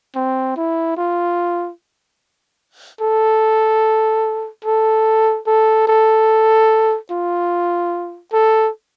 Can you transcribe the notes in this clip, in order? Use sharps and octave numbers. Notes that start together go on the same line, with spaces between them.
C4
E4
F4
A4
A4
A4
A4
F4
A4